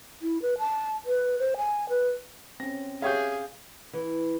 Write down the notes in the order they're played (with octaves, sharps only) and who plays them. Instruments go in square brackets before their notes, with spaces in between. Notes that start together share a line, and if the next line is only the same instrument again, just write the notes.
[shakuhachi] E4
B4
A5
B4
C5
G#5
B4
[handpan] C4 C#4 [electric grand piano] A#6
[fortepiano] G4 C#5 E5 [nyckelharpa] G#4 [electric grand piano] F5 G6
[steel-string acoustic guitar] E3